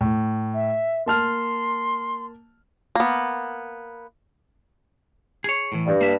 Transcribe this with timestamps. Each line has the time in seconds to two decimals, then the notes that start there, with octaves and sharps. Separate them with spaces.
0.01 A2
0.54 E5
1.06 A#3 A5 C6 F6
2.95 A#3 B3
5.44 G#4 C#5
5.72 A2 E3
5.86 G2
6.01 A#3 E5